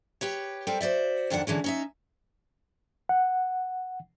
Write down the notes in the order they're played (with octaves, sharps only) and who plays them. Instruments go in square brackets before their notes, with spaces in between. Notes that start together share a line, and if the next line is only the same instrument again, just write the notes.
[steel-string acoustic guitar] G4 B4 C#5
G3 C4 A4 A#4
F#4 C5 D5 E5
F2 D#3 D4 F#5
D3 E3 G#3 C#4
C#4 D#4 E5
[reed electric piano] F#5